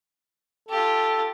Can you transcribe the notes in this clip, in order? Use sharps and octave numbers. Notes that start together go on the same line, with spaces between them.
F4 G4 A4